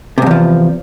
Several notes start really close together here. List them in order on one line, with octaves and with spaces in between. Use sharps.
C3 G#2 E2 F3